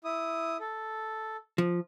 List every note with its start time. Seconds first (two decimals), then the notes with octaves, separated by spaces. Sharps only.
0.04 E4 D#6
0.60 A4
1.58 F3